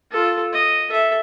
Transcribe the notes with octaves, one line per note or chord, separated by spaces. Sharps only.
F4 A4
D#5
A4 E5